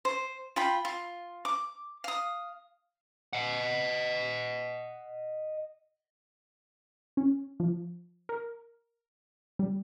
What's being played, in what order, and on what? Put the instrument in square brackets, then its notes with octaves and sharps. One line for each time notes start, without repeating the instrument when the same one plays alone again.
[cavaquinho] C5
F4 G5 B5
F4
D6
F5 D#6
[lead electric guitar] D#5 F#5
[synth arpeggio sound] C#4
F3
A#4
G3